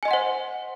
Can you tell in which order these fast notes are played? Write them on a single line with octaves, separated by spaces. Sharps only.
G#5 D#5 C6 F#5 C5